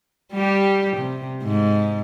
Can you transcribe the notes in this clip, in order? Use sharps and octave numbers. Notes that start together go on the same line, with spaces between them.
G3 G4
C3
G#2